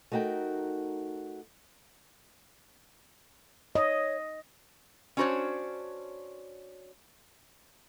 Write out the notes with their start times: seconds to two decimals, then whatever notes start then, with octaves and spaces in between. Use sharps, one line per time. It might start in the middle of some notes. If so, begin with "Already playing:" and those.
0.12 A3 D#4 F#4 A#4 G5
3.75 C#5 D#5
5.17 C#4 D4 F#4 A#4 C5 C#5